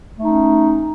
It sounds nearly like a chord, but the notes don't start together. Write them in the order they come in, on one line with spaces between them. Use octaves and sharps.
A3 D#4 C#4